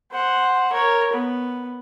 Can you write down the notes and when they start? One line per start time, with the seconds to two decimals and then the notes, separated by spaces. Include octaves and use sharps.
0.12 C5 F#5
0.72 A#4 C#5
1.12 B3